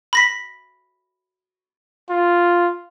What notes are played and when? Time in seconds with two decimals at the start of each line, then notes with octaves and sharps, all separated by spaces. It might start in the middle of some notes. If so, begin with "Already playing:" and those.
0.13 B5 A#6 B6
2.10 F4